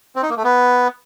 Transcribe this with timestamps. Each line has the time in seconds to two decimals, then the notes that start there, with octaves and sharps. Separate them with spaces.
0.16 C4
0.23 D#4
0.30 A#3
0.37 A3
0.44 B3